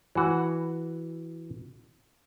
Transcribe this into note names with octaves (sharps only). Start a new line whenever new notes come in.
E3 F#4